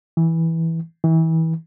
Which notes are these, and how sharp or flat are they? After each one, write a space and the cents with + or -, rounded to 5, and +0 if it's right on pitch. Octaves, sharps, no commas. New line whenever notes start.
E3 -10
E3 -30